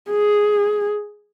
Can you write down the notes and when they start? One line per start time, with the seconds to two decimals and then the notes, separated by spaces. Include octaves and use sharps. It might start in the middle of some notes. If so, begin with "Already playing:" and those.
0.11 G#4